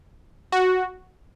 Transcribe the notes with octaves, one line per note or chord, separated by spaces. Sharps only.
F#4